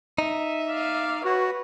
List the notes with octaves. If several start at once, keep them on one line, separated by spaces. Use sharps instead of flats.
D#4 E5
D5 F5
F#4 B4 C#5